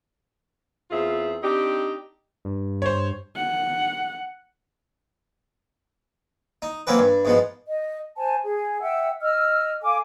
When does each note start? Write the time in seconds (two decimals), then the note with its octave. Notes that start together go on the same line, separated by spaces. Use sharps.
0.91 E2 C4 F4 G#4 E5
1.43 C4 D4 D#4 G4
2.45 G2
2.82 C5 C#5
3.36 F#5
6.62 D#4
6.87 F#3 A#3 C4 C#4 B4
6.99 G2
7.25 G#2 B2 F3
7.67 D#5
8.17 C5 G#5 A5
8.43 G#4
8.81 E5 F#5 G5 E6
9.21 D#5 E6 F6
9.82 A4 F5 G#5 D6